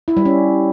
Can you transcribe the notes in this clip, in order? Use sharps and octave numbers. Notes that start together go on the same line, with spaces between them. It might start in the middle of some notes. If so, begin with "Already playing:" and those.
E4
G3
C#4